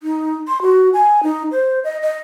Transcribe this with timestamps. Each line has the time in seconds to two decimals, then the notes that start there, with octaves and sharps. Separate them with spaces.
0.03 D#4
0.48 C6
0.62 F#4
0.93 G#5
1.23 D#4
1.51 C5
1.84 D#5
2.02 D#5